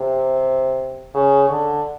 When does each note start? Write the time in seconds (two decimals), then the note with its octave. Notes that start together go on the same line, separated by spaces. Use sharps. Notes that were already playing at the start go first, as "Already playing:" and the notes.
Already playing: C3
1.14 C#3
1.50 D3